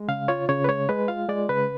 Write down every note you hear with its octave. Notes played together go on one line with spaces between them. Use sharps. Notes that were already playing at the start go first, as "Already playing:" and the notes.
Already playing: G#3
C#3 F5
F4 C#5
C#3 C#5
B4
G#3 C#5
G#3 B4
F4 F5
G#3 D5
C#3 B4